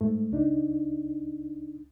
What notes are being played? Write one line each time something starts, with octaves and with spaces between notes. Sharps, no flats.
G#2 A3
C#2 D4 D#4